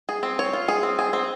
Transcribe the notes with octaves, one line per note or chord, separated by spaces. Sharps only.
G#4
C4
C#5
F4
G#4
C4
G#4
C4